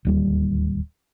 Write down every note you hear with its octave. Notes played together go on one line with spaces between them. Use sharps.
D1 D#2 G3